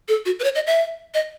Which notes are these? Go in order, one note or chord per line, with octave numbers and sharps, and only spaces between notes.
A4
F#4
B4
C#5
D#5
E5
D#5